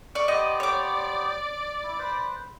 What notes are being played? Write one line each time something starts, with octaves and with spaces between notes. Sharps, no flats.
D5 C#6
B3 G4 C5 D5 D#5
C#5 D6
E4
B4 C5